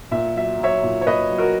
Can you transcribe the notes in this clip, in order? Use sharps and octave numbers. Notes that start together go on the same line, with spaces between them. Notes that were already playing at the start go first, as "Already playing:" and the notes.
A#2 E5
F#3 E5
F#3 C#5 E5
A#2
C#5
A#2 B4 D#5
F#3
F#4 A#4